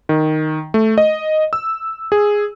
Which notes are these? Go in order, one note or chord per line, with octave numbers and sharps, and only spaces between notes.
D#3
A3
D#5
E6
G#4